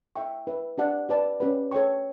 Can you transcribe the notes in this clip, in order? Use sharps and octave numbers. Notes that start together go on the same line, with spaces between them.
E4 A4 E5 G5 C#6
E4 B4 E5
D4 G4 D5 F#5 A5
G4 B4 D5 A5
C#4 G4 B4
A4 C#5 G5 C#6